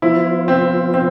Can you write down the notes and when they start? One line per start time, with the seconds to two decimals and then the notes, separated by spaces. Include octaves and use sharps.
0.02 F3 B3 E4 F4 C5
0.48 C4
0.94 C4